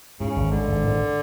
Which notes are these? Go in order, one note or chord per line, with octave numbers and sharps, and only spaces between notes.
G#2 C#3
G#1
D3 G#3
G#1
G#1